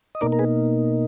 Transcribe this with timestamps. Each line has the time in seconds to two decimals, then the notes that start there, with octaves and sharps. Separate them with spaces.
0.15 D#5
0.21 B2 A#3 D#4 A#4 D5
0.32 A#4
0.39 G#4 B4